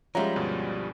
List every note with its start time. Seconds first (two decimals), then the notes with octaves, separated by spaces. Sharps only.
0.15 F3 G3 G#3 C#4 E5 F#5 A#5
0.36 D2 G2 B2